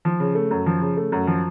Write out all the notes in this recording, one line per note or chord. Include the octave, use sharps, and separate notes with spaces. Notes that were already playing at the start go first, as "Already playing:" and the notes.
F3
C#3
A3
F#2
F3
C#3
A3
F#2
F3